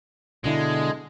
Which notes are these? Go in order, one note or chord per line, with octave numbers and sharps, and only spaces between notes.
B2 D3 G#3 E4